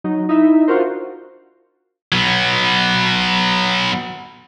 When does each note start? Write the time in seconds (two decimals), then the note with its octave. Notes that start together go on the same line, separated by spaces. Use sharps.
0.04 F#3 D#4
0.29 D#4 E4 E5
0.68 D4 F4 F#4 A#4 C5
2.12 F#3 B3